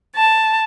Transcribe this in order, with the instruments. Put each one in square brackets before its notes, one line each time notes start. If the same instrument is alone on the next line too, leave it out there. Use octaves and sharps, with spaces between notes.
[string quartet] A5